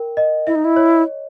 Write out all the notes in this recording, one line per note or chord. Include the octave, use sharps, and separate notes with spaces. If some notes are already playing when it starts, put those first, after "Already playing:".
Already playing: A#4 G5
D#5
E4 E5
D#4
E4
C#5